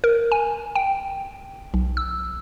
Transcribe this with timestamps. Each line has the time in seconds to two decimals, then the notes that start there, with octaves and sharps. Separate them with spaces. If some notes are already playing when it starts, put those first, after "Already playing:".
0.04 A#4
0.32 G#5
0.75 G5
1.74 B1
1.97 E6